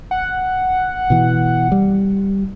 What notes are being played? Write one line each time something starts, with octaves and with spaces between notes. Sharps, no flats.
F#5
B2 E3
G3